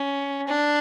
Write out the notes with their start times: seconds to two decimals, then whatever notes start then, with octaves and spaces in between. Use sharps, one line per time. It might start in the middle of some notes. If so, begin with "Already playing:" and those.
Already playing: C#4
0.47 D4